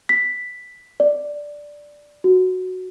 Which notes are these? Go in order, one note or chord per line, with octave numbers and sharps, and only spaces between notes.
B6
D5
F#4